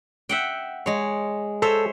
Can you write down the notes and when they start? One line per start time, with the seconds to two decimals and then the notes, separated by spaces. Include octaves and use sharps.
0.29 E5 F#5 G5
0.86 G#3 C#5
1.62 A4 C5 C#5 E5